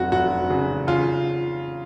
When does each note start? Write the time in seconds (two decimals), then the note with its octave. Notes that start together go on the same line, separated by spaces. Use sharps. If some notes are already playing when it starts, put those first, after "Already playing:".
Already playing: F1 F#3 F#4
0.12 F1 F#4
0.50 C#3
0.87 C#3 F4